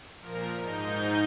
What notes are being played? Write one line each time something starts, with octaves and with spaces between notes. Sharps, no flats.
A#2 F3 A#4
G#2 D#4 G6